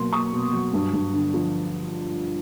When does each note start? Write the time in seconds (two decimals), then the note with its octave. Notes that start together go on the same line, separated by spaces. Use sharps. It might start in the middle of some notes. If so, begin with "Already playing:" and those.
Already playing: B2 F#3 A#3 C6
0.12 A#3 C#6 D#6
0.32 B2
0.53 F#3
0.73 G2
0.93 G2
1.14 D3
1.34 F3